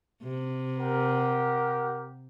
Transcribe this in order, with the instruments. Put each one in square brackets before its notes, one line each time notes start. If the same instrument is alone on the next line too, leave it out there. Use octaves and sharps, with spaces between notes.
[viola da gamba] C3
[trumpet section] G4 A#4 F#5